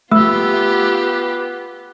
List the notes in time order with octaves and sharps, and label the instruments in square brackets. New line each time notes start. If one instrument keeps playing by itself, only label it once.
[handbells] A3 [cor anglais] B3 [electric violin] F4 G4 [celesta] E6